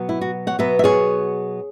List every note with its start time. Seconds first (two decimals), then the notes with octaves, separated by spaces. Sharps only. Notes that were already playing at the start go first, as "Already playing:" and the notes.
Already playing: B2 F#3 B3
0.09 E4
0.21 F#4
0.47 C#5 F#5
0.59 B2 F#3 B3 B4 E5
0.79 E5
0.84 G#4 C#5